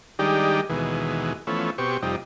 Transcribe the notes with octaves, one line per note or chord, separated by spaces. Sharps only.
D#3 G3 G#3 D4 D#4 G4
D#2 B2 E3 G#3
E3 F3 A3 B3 C#4
B2 C4 G4 C#6
F2 C3 G3 D#4